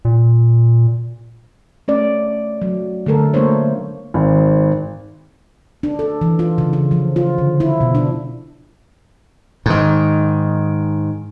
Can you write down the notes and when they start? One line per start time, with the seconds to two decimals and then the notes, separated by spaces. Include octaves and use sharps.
0.05 A#2
1.88 A3 C#4 D5
2.62 F#3
3.06 D3 A3 A4 A#4
3.34 A3 A#3 D4 C5 C#5
4.14 G#1
5.83 D4
5.99 A4
6.21 E3
6.39 F4
6.58 C#3
6.73 F4
6.91 F3
7.16 F4
7.38 D3
7.60 E4
7.81 B2
7.95 D4
9.66 G#2 D#3